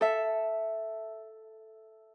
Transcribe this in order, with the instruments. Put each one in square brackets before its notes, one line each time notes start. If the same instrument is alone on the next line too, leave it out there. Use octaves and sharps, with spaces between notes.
[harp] A4 E5